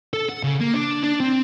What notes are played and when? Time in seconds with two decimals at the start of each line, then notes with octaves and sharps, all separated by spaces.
0.14 A4
0.29 F#5
0.43 C#3
0.61 A#3
0.74 D4
1.03 D4
1.20 C4